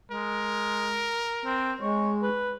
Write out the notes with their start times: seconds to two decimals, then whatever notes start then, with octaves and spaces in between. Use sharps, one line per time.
0.11 G#3 A#4
1.45 C4
1.81 G#3 C#5
2.22 B4